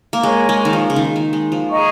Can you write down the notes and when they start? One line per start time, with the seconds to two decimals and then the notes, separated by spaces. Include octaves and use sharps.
0.13 A#3
0.23 G#3 A#4 C#5 G#5 C#6
0.49 G#3
0.65 D#3
0.73 F3
0.90 C#3
0.96 D#3
1.16 D#3
1.33 G#3
1.52 F3
1.70 G#4 D#5 A#5 C#6